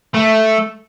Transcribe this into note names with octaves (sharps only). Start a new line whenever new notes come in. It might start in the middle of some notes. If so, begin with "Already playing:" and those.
A3